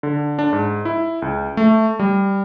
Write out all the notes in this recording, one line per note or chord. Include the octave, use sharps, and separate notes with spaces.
D3
D4
G#2
E4
C#2
A3
G3